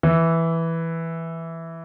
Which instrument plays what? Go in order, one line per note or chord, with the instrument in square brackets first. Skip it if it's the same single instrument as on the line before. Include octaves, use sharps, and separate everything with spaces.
[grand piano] E3